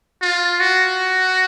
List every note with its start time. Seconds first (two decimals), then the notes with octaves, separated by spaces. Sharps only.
0.22 F4
0.60 F#4